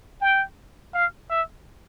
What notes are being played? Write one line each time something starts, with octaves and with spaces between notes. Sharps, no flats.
G5
F5
E5